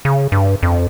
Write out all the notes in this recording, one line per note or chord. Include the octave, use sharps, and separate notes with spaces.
C#3
G2
F2